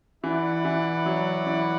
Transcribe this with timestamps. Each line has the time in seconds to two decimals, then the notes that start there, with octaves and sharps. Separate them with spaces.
0.24 E3 E4 B4 D5 F#5
0.65 E3
1.06 F#3
1.47 E3